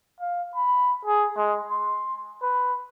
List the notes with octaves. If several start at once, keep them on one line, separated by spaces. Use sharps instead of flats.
F5
B5
G#4
G#3
C6
B4